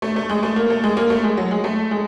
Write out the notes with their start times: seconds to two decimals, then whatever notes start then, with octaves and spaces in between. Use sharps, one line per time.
0.02 A3
0.16 A3
0.29 G#3
0.43 A3
0.56 A#3
0.70 A3
0.84 G#3
0.97 A#3
1.10 A3
1.24 G#3
1.37 F#3
1.51 G#3
1.64 A3
1.91 G#3